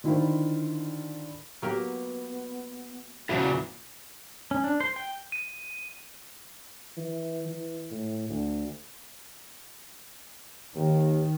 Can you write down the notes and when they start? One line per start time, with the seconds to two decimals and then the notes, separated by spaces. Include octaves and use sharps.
0.04 D3 D#3 E4 F4 A#4 C5
1.62 F#3 A#3 B3 G4
3.29 E2 A#2 C#3 F3 E4 F#4 B4
4.51 C#4
4.64 D4
4.80 C5
4.96 G5
5.32 D#7
6.97 E3
7.45 E3
7.91 A2
8.29 D2
10.75 D#2 D#3